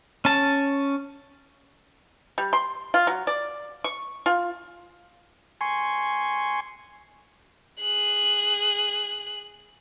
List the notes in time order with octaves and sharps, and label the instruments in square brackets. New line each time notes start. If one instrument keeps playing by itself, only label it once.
[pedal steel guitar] C#4 A5
[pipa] G3
C6
F4
F#3
D5
C#6
F4
[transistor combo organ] G#5 C6 C#6
[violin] G#4 F#6